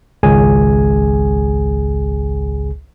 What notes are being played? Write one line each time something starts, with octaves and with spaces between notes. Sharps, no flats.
G#1 C#2 G#4 G#5